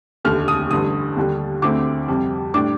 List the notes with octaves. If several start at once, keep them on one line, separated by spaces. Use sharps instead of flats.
F1 D#2 D3 A3 F6
D#6
A1 G2 D3 D#6
D#2 D3 G3 D4
D2 D3 A3 C4 D6
F2 C3 G3
A2 G3 D4 D6